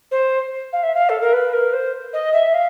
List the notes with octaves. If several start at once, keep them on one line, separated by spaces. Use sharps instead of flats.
C5
F5
E5
F5
A4
A#4
B4
A#4
C5
D#5
E5
F5